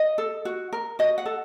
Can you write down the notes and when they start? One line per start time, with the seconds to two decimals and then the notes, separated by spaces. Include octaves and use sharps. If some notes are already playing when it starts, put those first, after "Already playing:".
Already playing: D#5
0.18 A4
0.45 F#4
0.73 A#4
0.99 F#4 D#5
1.18 F#5
1.26 A4